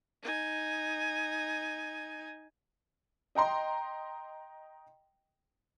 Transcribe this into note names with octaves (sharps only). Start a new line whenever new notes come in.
D#4 G#5
D#5 G5 A#5 C6